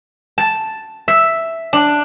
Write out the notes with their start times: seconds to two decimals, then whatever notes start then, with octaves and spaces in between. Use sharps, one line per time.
0.38 A5
1.08 E5
1.73 D4